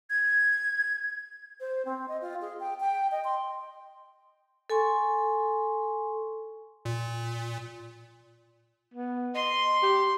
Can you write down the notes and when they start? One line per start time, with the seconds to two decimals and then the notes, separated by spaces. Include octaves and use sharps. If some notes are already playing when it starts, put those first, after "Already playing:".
0.10 G#6
1.60 C5
1.85 C4
2.08 D#5
2.21 F4
2.41 G#4
2.60 G5
2.80 G5
3.12 D#5
3.24 C6
4.70 A4 G#5 C6 C#6
6.85 A#2
8.94 B3
9.35 D#5 C6
9.83 G4